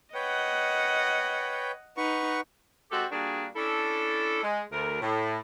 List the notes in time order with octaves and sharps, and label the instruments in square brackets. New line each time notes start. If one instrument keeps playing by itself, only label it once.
[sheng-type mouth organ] B4 C#5 G5 [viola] D#5 F#5
[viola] D#4 [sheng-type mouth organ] B4 F#5 C#6
[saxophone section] G#3 C4 F#4 G4 A4
G3 A#3 D4 F#4 G#4 A#4
C#4 D4 E4 A4
G#3
D2 A#4
A2